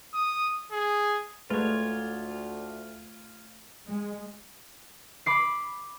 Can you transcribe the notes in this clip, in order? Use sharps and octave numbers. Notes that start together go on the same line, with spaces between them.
D#6
G#4
D2 G#3 A3 F4 B4 C#5
G#3
B5 D6 C7